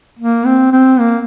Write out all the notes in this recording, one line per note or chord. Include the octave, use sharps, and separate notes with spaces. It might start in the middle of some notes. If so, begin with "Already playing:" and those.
A#3
C4
C4
A#3